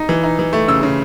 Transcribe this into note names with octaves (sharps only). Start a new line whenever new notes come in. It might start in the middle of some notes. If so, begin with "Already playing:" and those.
Already playing: D#4
E3
D#4
E3
A3
C#3 E6
C#3